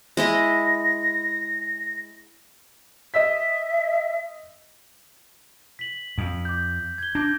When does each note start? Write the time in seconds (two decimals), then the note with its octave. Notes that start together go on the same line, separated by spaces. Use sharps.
0.17 G#3 E4 D#5 A#6
3.14 D#5 E5 E6 B6
5.79 B6 F#7
6.18 F2
6.45 D6 G6
6.98 G#6 G7
7.15 D4 D6 G6 A#6